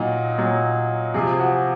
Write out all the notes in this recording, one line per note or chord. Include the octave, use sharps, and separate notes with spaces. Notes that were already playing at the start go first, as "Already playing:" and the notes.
Already playing: A#2 F#3 D#4
A#2 F#3
C3 F3 G#4
G#4
F#4